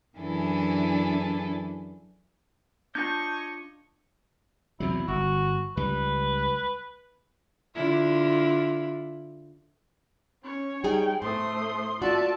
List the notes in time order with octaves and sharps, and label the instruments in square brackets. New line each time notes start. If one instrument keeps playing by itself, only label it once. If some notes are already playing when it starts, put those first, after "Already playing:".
[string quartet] F#2 E3 D4 E4 G#4 A4
[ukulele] D4 F4 A5 [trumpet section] C#5 D#5 C#6 [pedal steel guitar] G6
[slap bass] E2 C3 F#3 [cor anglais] E4
[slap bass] G1 [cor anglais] F#4
[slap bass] C#2 G3 [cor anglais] B4
[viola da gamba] D3 E4 F4
[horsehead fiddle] C#4 [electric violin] C#5
[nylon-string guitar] G3 D#4 G#4 [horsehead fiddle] G5
[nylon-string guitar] A2 [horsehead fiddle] A3 C5 [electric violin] C6 D#6
[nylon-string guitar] A3 F#4 [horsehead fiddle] F4 D5 [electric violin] E5 A5